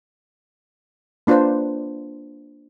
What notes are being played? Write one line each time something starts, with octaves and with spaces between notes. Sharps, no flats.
A#3 D4 F4 B4 C5